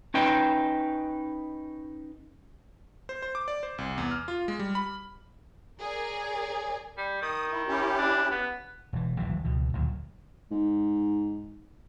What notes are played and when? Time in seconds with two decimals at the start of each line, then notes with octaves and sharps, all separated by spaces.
0.14 C#4 D#4 B4 G5
3.09 C5
3.22 C5
3.35 D6
3.48 D5
3.63 C5
3.78 C2
3.98 E2
4.11 F6
4.28 F4
4.48 G#3
4.59 G3
4.75 B5
5.80 G#4 A#4 C#5 D5 G#5
6.98 G3
7.22 D#3 D#6
7.51 E4
7.68 C#4 E4 G4
7.98 D4
8.31 B3
8.93 E1 E3
9.18 D#1 A#1 E3 F#3
9.44 C#2 B2 E3
9.73 G#1 D2 A#2 F#3
10.51 G#2